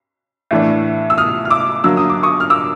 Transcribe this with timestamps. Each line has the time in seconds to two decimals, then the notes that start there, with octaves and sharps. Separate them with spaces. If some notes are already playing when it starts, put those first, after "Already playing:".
0.51 A2 E3 A3 D4
1.10 E6
1.18 D#6 F6
1.45 F6
1.50 D6 E6
1.84 D3 F#3 A#3 E6
1.97 D#6
2.10 D6
2.23 C#6 D#6
2.40 F6
2.50 D6 E6